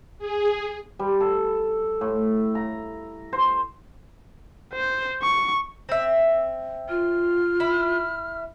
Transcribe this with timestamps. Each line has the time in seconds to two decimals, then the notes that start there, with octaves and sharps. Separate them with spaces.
0.19 G#4
0.99 G3
1.21 A4
2.01 A2
2.55 A#5
3.33 C5
4.73 C5
5.22 C#6
5.89 C4 E5
6.89 F4 F6
7.60 E4